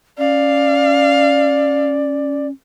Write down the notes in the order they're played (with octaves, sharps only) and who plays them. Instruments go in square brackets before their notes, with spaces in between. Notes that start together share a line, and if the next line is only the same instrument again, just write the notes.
[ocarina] C#4 [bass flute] D5 [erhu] F5